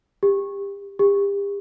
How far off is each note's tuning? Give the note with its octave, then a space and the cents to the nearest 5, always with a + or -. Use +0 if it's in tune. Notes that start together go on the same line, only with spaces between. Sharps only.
G4 +25
G4 +35